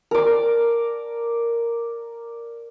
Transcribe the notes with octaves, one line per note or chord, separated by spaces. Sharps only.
A#4 D5